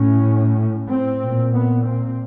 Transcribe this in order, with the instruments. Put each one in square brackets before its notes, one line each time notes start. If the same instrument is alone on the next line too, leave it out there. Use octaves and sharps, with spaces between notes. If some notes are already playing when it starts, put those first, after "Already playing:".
Already playing: [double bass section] A2 C#4
C4
A#2
B3
C4